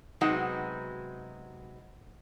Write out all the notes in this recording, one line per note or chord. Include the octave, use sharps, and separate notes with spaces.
C3 F#3 G#3 B3 D#4 F#4